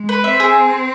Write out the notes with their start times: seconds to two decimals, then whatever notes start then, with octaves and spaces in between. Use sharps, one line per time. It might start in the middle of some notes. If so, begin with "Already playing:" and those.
Already playing: G#3
0.09 B4
0.24 C4 E5
0.40 G#4